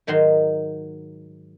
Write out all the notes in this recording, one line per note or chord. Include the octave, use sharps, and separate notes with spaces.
G#2 D#3 F#3 D#4 C6